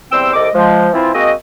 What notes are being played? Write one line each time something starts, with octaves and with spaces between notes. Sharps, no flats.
E2 G3 C4 C5 G5 E6
C2 C3 A4 D#5 D6
F3 G#3
E3 F3 C4 E4 F4
G#3 A#3 C4 F#4 D#5